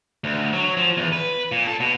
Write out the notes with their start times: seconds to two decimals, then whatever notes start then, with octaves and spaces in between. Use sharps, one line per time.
0.24 D2
0.53 F#3
0.77 F3
0.97 E2
1.12 B4
1.52 A#2
1.67 A4
1.80 B2